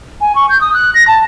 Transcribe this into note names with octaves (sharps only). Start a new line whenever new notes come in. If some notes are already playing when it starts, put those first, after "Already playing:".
G#5
C#6
G6
D#6
F#6
A#6
A5